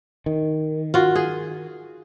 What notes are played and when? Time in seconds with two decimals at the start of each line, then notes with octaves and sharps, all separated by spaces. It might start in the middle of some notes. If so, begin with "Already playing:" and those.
0.26 D#3
0.94 F4 F#4
1.15 G#4